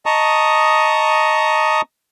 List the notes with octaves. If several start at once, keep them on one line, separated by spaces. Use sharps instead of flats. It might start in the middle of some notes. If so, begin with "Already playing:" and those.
D#5 A5 A#5 C#6 D#6